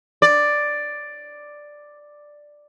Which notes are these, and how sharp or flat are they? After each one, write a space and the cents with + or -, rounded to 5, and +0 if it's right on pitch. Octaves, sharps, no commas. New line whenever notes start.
D5 +5